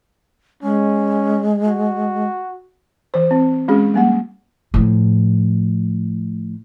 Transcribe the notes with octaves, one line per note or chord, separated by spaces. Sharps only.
G#3 C#4
F#4
E3 C5
C4
G#3 C#4 F#4 G#4
G3 A#3 F#5
A2 F3